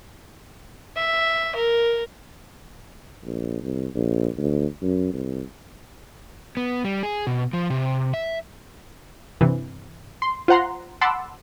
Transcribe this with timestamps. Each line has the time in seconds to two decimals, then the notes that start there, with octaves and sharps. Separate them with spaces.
0.96 E5
1.55 A#4
3.24 A#1
3.62 C2
3.95 A#1
4.37 D2
4.82 F#2
5.13 C2
6.57 B3
6.84 G3
7.03 G#4
7.27 B2
7.53 F3
7.70 C3
8.14 E5
9.41 G2 C3 E3
10.22 C6
10.48 F4 C5 F#5 A#5 C6
11.01 F#5 A5 B5 C6 D6 E6